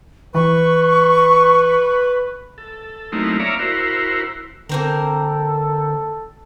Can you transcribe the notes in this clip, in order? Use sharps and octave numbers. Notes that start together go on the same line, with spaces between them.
E3 B4 C#6
A4
F#3 A3 A#3 C4 D#4 E4
C#5 D5 E5 F5 A#5
E4 F#4 A#4 C5
D3 A#3 C4 A4 A#4